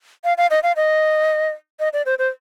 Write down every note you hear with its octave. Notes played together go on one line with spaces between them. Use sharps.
F5
F5
D#5
F5
D#5
D#5
D5
C5
C5